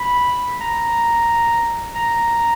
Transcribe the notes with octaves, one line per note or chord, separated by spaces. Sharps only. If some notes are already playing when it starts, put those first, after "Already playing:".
Already playing: B5
A#5
A#5